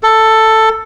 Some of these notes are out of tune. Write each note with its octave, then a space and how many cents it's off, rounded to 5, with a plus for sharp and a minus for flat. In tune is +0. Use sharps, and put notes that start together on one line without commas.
A4 +10